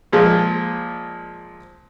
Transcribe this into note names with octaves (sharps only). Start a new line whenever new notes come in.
A#2 F3 G#3